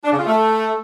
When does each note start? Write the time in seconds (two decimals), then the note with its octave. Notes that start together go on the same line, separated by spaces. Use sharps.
0.04 D4
0.12 C#3
0.19 F4
0.26 A3